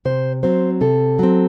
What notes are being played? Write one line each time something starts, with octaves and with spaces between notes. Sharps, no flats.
C3 C5
F#3 C4 C5
C3 A4
F#3 C4